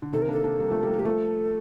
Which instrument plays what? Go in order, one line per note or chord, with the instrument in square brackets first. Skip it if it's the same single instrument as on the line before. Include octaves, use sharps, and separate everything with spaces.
[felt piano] D3
[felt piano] C3 D#3 [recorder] A4
[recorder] A#4
[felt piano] A#3 D4 [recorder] A4
[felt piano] A#3 D4
G3 A#3
F3 A3
G3 A#3
G3 A#3
[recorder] G4
[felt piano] F3 A3 [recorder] A4